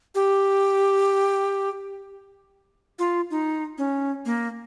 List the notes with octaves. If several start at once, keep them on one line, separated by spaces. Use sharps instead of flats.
G4
F4
D#4
C#4
A#3